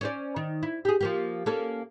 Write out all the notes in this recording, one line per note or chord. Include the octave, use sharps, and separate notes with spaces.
C#4 C5 D5
D#3
E4
G4 G#4
F3 A#3 G4
A#3 C#4 A4